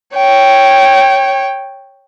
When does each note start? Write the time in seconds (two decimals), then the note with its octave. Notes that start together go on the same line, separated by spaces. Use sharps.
0.16 C#5 G5